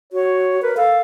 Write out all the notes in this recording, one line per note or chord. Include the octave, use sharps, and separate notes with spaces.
F#4 C#5
A#4 B4
A4 F5